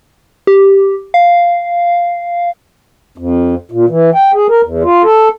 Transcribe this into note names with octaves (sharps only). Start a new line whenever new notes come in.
G4
F5
F2
A#2
E3
G5
G#4
A#4
E2
F4
A4